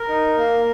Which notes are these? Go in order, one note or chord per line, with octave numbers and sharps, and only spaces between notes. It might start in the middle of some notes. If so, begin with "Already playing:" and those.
Already playing: A#4
D#4
A#3